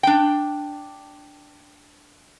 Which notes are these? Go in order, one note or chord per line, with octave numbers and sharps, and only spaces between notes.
D4 G5